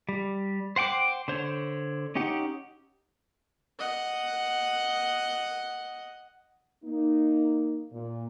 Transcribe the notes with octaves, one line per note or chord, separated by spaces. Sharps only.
G3
C5 F#5 G5 D6
D3 C5 C#5
C#4 D#4 G4 F#5
D#5 F#5
A#3 D#4
A#2